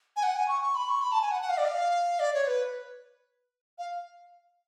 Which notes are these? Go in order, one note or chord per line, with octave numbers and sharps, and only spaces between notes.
G#5
F#5
G#5
C#6
C#6
B5
C#6
B5
A5
G#5
F#5
F#5
F5
D5
F5
D5
C#5
B4
F5